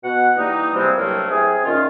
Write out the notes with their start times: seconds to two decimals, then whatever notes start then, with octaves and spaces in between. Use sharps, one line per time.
0.03 B2 F#5
0.36 E3 G3 A#3 D#4
0.73 C3 F3 G3 G#3 C4
0.96 C2 G2 F#3 A3 A#3
1.30 C4 E4 G#4
1.65 A#2 D#3 C#4 F4